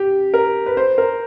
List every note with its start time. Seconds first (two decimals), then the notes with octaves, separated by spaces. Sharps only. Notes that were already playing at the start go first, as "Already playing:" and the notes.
Already playing: G4
0.34 A#4
0.66 B4
0.77 C5
0.98 A#4